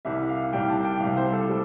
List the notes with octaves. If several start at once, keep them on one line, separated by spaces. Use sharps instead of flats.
C2 C3 G3 E5
F5
C2 C3 G3 G5
A5
G5
C2 C3 G3 F5
C5
A4
G3 G4